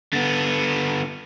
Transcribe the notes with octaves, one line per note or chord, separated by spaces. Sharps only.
D3 B3